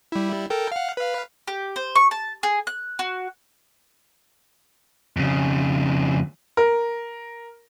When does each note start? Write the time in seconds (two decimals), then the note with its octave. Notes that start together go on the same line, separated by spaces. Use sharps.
0.12 G3 E4
0.50 A4 A#4 G5
0.72 F5 F#5
0.97 B4 F5
1.48 G4
1.76 C5
1.95 C#6
2.11 A5
2.43 G#4
2.67 F#6
2.99 F#4
5.17 F2 C#3
6.57 A#4